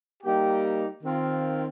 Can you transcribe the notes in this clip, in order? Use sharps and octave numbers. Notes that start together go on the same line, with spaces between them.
G3 A#3 D#4 G4
D#3 C4 F4